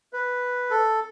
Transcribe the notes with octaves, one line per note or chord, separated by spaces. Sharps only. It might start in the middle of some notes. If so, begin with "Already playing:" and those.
B4
A4